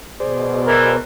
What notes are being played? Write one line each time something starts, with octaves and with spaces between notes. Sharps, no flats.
B2 G#4 C5 D5
E3 A#4